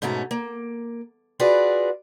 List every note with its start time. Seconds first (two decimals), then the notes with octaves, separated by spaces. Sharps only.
0.02 G#2 B2 A3 C#4 A#5
0.31 A#3
1.40 F4 F#4 G#4 B4 D5